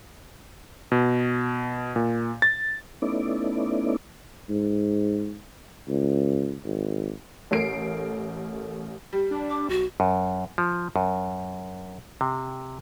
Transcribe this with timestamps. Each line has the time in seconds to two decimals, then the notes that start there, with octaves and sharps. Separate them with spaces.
0.92 B2
1.96 A#2
2.42 A6
3.02 A3 B3 C#4 D#4 E4 D5
4.50 G#2
5.88 C#2
6.65 G#1
7.51 A1 A3 A#4 C7 D7
9.13 G3
9.31 D4
9.50 D6
9.69 B1 F#4
10.00 F#2
10.58 F3
10.96 F#2
12.21 C3